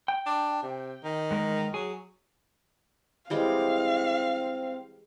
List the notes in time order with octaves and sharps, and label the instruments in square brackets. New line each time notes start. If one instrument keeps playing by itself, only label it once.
[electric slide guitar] G5
[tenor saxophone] D4
C3
D#3
[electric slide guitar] E2 G#3 A#4
[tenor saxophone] F#3 [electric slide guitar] G#4
[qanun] E3 G3 G#3 [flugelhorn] C4 [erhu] F5